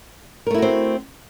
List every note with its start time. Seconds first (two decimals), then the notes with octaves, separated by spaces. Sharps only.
0.47 A#4
0.50 A3
0.54 E4
0.58 F#4
0.62 C4